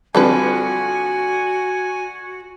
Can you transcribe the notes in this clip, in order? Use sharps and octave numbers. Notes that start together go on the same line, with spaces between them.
D3 F3 G3 C4 F#4 A4 B4 G#5